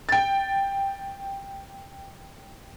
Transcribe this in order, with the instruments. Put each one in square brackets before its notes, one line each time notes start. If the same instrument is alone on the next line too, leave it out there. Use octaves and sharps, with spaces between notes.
[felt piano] G5 A6